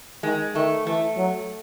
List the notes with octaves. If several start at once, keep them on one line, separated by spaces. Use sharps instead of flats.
D#3 G#3
D#3 A3
E3 A3
F#3